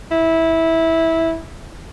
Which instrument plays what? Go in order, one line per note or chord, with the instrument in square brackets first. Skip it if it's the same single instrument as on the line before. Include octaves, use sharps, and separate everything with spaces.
[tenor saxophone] E4